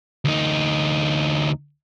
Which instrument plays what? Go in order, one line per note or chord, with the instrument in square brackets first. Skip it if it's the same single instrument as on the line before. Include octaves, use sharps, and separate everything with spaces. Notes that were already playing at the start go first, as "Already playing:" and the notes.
[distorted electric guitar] D2 D#4